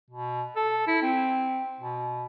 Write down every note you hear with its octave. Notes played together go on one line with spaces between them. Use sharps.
B2
A4
E4
C4
B2